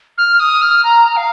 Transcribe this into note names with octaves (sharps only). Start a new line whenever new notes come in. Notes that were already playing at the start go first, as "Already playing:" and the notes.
F6
D#6
F6
A#5
F5